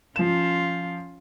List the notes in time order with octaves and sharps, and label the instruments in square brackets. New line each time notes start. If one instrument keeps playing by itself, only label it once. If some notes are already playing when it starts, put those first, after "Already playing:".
[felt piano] F3 E7 [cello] C#4 F4